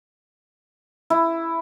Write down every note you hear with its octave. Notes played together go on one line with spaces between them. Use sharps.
E4